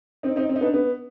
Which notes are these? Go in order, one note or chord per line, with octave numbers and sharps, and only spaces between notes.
C4 D#4
C4 D#4
C4
D#4
B3 D4
B3